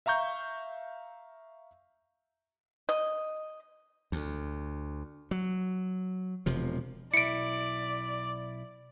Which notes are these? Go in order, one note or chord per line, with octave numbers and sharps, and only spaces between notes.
E5 F5 A#5 C#6 G6
D#5
D2
F#3
E1 C3 F3
B1 E4 D5 C#7 D7